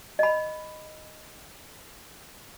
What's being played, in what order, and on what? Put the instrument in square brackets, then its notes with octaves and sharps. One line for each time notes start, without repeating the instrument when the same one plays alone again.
[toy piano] D#5 B5